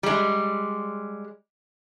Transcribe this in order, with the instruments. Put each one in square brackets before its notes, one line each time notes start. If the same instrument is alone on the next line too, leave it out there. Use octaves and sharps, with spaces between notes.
[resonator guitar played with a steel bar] G3 G#3